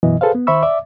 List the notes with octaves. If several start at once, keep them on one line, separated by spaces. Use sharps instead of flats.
F#2 B2 E3 D#5
G#4 A4 B4 C5 F5
B3
D#3 C5 E5 B5 C#6 E6
D5 E5 D6